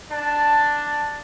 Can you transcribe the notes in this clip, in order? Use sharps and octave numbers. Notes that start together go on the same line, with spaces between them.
D4 A5